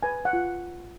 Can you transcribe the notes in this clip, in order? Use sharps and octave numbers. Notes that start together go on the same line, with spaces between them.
B4 G#5
F#5
F4